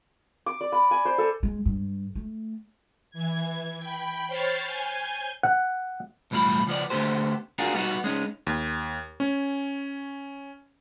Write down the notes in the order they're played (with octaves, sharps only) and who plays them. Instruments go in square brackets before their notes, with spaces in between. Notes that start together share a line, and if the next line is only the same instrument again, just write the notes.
[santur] D6
D5
B5
G#5
C5
A4
[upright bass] G#3
G2
A3
[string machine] E3 G#6
G5 B5
C5 C#5 C6 F6 A6
G#5 G6
[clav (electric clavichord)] F#5
[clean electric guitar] B1 E2 A2 G3 F4 B5
C#2 F3 B3 D5
D2 D3 A3 B3 G4 C5
D4 F4 F#4 G#4 A#4
G3 B3 D#4 F#4
G#3 C#4 D#4
[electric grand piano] D#2
C#4